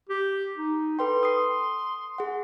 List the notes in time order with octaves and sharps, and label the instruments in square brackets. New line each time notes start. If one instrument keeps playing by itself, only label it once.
[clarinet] G4
D#4
[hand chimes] A4 B4 G5 [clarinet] C6
[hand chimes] D#6 C7
G#4 F#5